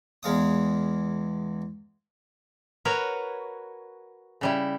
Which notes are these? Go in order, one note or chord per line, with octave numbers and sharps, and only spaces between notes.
E2 G#3 F5 D#6
F#4 A#4 B4 C#5
C#3 G3 E4